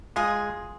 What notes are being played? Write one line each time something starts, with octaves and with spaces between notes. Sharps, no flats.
G#3 F4 G#4